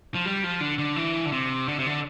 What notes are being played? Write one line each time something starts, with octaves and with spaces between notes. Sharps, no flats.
F3
G3
F3
D3
D3
E3
D3
C3
D3
C3
D3